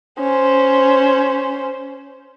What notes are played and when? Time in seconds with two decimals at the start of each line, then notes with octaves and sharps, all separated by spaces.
0.19 C#4 C5